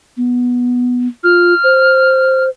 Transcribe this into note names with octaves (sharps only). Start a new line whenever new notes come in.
B3
F4 F6
C5